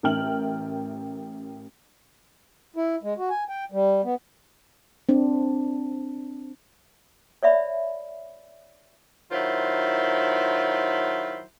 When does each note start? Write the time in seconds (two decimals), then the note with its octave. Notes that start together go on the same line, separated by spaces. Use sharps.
0.03 A1 A#4 E5 G5 F6 F#7
2.76 E4
3.03 G#3
3.18 F#4
3.30 G#5
3.49 G5
3.72 G3
4.05 B3
5.09 C4 D4
7.43 C#5 D5 E5 B5
9.32 D#3 F#3 E4 F4 C5